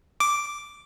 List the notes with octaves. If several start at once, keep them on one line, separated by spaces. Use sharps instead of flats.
D6